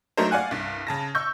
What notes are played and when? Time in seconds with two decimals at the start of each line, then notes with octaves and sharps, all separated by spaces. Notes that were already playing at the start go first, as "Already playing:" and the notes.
0.17 F#3 A3 D4 D#4 A#4 C5
0.31 D5 F5 F#5 G#5 F#6
0.51 C2 G2
0.87 C#3 A5 A#6
1.15 C#6 E6 G6